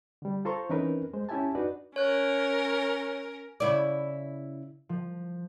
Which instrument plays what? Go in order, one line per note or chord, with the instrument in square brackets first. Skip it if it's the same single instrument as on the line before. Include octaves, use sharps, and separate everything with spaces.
[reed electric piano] D3 G3
F4 A4 C5 A#5 C6 C#6
E3 C4 C#4 D#4 A#4 B4
G#3 C5
C#4 E4 G4 E5 G#5 A5
D4 D#4 F#4 B4 D5
[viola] C#4 A#4 [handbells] C#5 F#6
[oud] C#3 E4 D5
[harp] F3